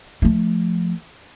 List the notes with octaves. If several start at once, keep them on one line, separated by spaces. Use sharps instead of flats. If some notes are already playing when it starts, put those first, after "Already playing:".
F3 A3